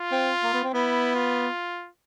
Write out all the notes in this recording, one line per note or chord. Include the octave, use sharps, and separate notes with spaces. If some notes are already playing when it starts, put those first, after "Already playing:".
Already playing: F4
C4
A#3
B3
C4
B3 E4
F4